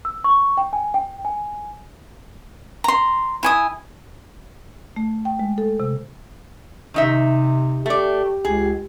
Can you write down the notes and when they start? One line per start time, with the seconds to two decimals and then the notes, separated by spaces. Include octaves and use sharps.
0.05 E6
0.24 C#6
0.57 G5
0.73 G#5
0.94 G5
1.25 G#5
2.84 A#5 C6
3.43 E4 G#5 D#6
4.96 A3
5.25 G5
5.39 G#3
5.58 A4
5.80 C3
6.94 C3 D#3 D#4 E5
7.86 A3 G4 D5
8.45 C#2 G#4